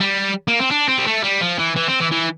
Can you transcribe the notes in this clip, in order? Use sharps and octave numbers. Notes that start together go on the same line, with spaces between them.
G3
A#3
C4
D4
C4
G3
A3
G3
F3
E3
E3
C4
E3
E3